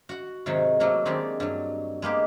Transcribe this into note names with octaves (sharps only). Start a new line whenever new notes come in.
F#4 F#5
G#2 C3 D#3 F#3 C5 C#5
F#3 A3 A#3 F#4
D#3 G#3 C4 D4 G4
G2 F#3
G#3 A#3 B3 G4